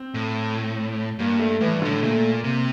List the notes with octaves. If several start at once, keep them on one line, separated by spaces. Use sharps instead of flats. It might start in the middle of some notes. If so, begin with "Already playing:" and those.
Already playing: C4
A2
G2 A#3
A3
A2 E3
G2
A2 D3
A#2 A3
A#3
C3